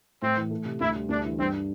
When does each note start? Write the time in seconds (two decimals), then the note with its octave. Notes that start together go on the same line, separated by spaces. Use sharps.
0.22 A2 C4
0.36 E3
0.51 A3
0.65 C3
0.80 D2 E4
0.95 G3
1.09 D2 D4
1.24 E3
1.39 G2 C4